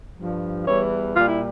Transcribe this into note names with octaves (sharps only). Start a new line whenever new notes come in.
G2 F3
E2 E3 G3 C#5
A#2 G3 F4
E4